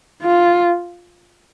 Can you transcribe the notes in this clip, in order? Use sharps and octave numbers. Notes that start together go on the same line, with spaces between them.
F4